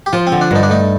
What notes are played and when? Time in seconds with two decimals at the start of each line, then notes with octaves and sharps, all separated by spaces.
0.06 G4
0.13 F3 F4
0.27 C4
0.32 D3
0.41 D4
0.51 G2 D#4
0.63 D4
0.70 A3 D#4